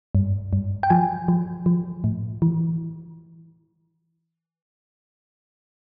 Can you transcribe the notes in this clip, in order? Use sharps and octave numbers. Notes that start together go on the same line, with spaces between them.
G2
G2
G5
F3 G#5
F3
F3
A2
E3